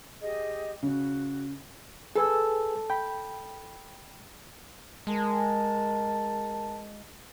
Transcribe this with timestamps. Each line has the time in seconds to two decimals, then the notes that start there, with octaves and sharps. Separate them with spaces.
0.21 G4 G#4 D#5
0.83 C#3 F#4
2.15 G#4 A4 B4 G#5
2.90 G5 B5
5.07 G#3 A#4 A5